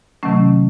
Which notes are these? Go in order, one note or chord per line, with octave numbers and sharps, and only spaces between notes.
C3 D#3 F#3 A3 C#4